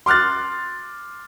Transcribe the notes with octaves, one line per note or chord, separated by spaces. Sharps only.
C6 D6 F6 F#6 A6